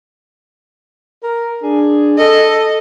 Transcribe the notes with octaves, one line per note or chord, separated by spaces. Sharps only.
A#4
D4 G#4
A4 D#5